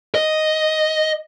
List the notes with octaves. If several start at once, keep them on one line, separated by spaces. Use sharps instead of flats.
D#5